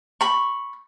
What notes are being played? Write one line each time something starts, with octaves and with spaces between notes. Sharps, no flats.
B5 C#6